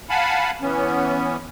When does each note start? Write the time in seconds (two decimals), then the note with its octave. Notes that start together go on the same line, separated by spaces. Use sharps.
0.09 F5 F#5 G#5 A5 B5
0.61 E3 B3 C#4